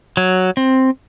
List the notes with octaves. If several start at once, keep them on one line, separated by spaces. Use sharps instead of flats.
F#3
C4